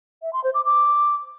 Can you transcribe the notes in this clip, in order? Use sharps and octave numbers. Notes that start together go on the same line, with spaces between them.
E5
C6
C5
D6
D6